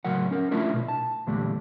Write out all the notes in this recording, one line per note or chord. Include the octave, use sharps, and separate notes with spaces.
A2 C#3 F#3 A#4 F#5
C#4 A#4
A3 D4 E4 F4 A#4
B2
A5
E2 A#2 D3 G3 A3 D4